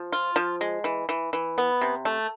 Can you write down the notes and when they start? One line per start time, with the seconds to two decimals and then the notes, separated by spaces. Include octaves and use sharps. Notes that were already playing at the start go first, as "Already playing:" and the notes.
Already playing: F3
0.12 F4
0.36 F3
0.61 G#3
0.84 E3
1.09 E3
1.33 E3
1.58 B3
1.81 C3
2.05 A3